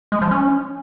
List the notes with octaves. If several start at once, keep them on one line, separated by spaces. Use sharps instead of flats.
G#3
F3
C#4